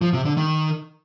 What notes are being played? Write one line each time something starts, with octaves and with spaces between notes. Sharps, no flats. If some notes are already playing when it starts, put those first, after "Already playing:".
F3
C3
D3
D#3